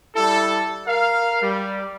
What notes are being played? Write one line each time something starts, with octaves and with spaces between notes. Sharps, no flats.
G3 E4 A4
A#4 F5
G3